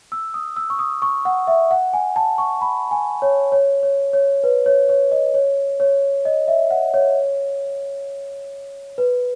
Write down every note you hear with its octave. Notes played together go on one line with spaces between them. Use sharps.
E6
D#6
E6
C#6
D#6
C#6
F#5
E5
F#5
G#5
A5
C#6
B5
G#5
C#5
C#5
C#5
C#5
B4
C#5
C#5
D#5
C#5
C#5
D#5
E5
F#5
C#5
B4